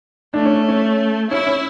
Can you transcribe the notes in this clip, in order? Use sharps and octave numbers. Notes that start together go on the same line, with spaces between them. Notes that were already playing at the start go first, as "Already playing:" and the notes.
A3 D4
C#4
C#4
C#4 E4
C#4